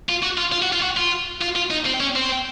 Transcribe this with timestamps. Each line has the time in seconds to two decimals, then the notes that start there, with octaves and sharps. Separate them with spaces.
0.09 F4
0.23 F#4
0.38 F4
0.52 F4
0.62 F#4
0.73 F4
0.82 F#4
0.97 F4
1.41 F4
1.56 F4
1.70 D#4
1.85 C4
2.00 C#4
2.15 C4